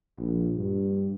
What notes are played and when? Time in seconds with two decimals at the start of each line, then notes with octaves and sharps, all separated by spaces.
0.18 A#1
0.56 G2